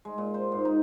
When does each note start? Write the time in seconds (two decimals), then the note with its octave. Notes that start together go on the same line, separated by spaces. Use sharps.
0.05 G#3
0.18 A#2
0.34 C5
0.52 G#2
0.65 D#4